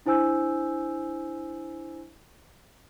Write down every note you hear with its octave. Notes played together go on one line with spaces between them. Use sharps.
D4 E4 C5 G#5 E6 G6